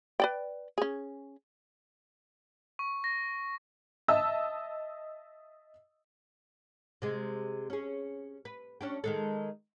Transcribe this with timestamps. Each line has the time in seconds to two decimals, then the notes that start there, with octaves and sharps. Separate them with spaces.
0.20 B4 D5 G5
0.78 C#4 G#4
2.79 C#6
3.04 A#6
4.08 D#5 E5 A5 E6
7.02 C3 G#3
7.70 C#4 G#4
8.45 B4
8.81 C#4 D4 G4
9.04 D#3 G#3 A4